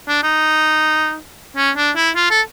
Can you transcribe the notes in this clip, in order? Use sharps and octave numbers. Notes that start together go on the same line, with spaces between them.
D4
D#4
C#4
D4
E4
F4
A4